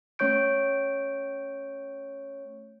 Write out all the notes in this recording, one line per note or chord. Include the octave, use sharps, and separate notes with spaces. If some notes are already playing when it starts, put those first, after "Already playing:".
A3 C#4 C#5 C#6 G6 D7